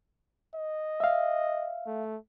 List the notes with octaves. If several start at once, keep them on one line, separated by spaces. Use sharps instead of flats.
D#5
E5 F5
A3